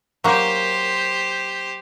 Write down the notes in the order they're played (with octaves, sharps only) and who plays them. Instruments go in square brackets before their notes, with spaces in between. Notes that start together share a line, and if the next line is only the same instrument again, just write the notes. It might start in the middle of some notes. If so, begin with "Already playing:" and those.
[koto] F#3 A#3 [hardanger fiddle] G4 C5